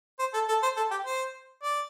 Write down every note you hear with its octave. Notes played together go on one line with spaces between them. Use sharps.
C5
A4
A4
C5
A4
G4
C5
D5